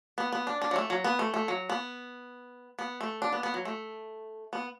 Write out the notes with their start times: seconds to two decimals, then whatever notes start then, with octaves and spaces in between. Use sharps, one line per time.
0.18 B3
0.32 B3
0.47 D4
0.62 D4
0.71 F#3
0.76 A3
0.90 F#3
1.04 B3
1.19 A3
1.34 A3
1.48 F#3
1.69 B3
2.79 B3
3.01 A3
3.22 D4
3.32 B3
3.43 B3
3.54 F#3
3.65 A3
4.53 B3